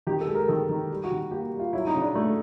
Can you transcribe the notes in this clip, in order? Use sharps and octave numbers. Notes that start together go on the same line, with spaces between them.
D#3 G4
A4
G#3
A#4
D#3 A4
D#3
G3
F#4
D#3
A#3 G4
G3
F4
F#3 E4
D#4
C#3
D4
A3